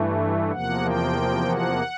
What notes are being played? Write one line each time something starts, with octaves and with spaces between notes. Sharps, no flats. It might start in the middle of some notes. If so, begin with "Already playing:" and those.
Already playing: G2 E3 A3
E2 C3 F3 A#3 F#5
G5
F#5